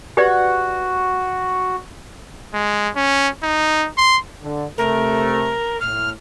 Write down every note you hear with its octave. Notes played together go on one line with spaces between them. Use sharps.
F#4 G4 B4 D5
G#3
C#4
D#4
C6
D3
C3 A3 A#4
A2 F6